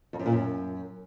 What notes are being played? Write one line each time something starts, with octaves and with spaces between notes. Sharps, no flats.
F2
F#2
A#2
F#2